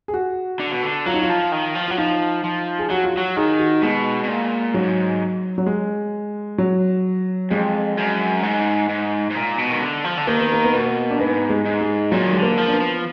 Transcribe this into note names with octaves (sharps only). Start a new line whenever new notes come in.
G#4
F#4
D3
B2
D3
F#3 F4
D#4
F4
F3
D#3
F3
F#3 F4
F3 D#4
F3
G#4
F#3 F#4
F4
F#3 F#4
D#3 G#4
F#4
B2 G#3
B2
A#2
G#2 F#3
F#3
G#3
F#3
F2 G#3
F#2
G#2
G#2
G#2
A#2
B2
D#3
D3
F3
D3
D#3 A#3
B3
A#3
B3
B2 A#3
D4
G#2 B3
G#3
G#2
G#3
A#2 F#3
D#3
D3 G#3
A#3
F3
D4
B3
F3